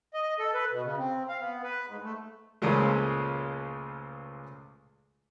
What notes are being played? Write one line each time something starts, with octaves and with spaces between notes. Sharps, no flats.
D#5
A4
B4
B2
C#3
C4
F5
B3
B4
G#2
A3
C#2 A#2 C#3 F3 G#3 A3